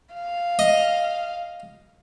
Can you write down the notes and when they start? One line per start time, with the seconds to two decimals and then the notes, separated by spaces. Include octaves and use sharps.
0.14 F5
0.59 D#5